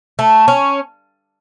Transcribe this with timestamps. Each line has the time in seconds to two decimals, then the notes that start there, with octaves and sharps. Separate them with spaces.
0.19 A3
0.48 C#4